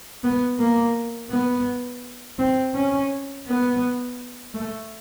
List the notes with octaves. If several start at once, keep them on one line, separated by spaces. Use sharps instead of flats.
B3
A#3
B3
C4
C#4
B3
A3